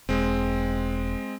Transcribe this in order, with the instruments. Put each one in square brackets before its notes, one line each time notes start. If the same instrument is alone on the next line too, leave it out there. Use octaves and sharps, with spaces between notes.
[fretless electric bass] E1 [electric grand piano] G#3 C4